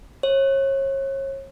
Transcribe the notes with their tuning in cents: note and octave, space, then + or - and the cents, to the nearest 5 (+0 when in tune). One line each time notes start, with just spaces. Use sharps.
C#5 -35